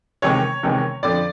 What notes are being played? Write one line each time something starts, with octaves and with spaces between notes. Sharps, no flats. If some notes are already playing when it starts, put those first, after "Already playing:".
E2 C3 D#3 G#3 C#5
E2 C3 D#3 G#3
F2 D3 F3 D5